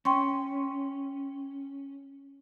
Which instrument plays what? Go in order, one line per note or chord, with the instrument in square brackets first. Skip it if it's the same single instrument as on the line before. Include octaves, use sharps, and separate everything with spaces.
[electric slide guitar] C#4 [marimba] G5 C6 C#6